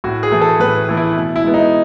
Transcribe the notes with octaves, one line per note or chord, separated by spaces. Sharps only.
A2 F#4
G#4
E3 A3
A4
A2 B4
E3 A3
E4
B2
E4
G#3 B3
D#4